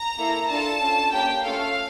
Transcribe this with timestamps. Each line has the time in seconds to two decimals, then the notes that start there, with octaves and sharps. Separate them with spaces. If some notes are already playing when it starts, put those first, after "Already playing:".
Already playing: A#5
0.18 A#3 E4 A4
0.49 D4 F4 A4 A5
0.81 C#4 F4 A4
1.12 A#3 C#4 G4 G5
1.44 A3 C#4 F4 A4 F5